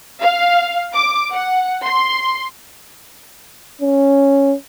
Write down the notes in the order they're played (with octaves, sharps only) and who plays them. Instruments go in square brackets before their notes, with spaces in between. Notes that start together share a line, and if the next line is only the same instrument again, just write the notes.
[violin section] F5
D6
F#5
C6
[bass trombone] C#4